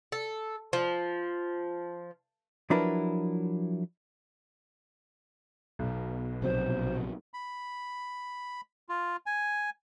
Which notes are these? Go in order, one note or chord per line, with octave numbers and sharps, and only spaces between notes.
A4
F3
F3 F#3 D4 E4 A#4 B4
B1 B2
A#1 C3 F#3 C5
B5
F4
G#5